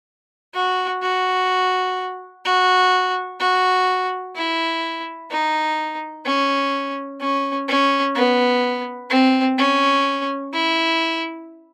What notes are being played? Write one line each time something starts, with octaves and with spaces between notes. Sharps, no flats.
F#4
F#4
F#4
F#4
E4
D#4
C#4
C#4
C#4
B3
C4
C#4
E4